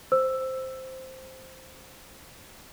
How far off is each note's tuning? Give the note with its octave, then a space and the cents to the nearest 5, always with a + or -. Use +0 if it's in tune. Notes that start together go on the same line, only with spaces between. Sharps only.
C5 +0 E6 +5